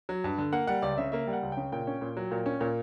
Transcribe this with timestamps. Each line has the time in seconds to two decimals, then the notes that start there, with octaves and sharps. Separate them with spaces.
0.09 F#3
0.24 G2
0.38 D3
0.53 A#3 F#5
0.67 G3 F#5
0.82 C#2 D5
0.98 C#3 E5
1.12 A#3 E5
1.27 G3
1.33 F#5
1.43 C#2
1.52 C#3 G5
1.72 A#2 G5
1.87 C#4
2.02 A#2
2.17 F#3
2.31 A#2
2.46 C#4
2.61 A#2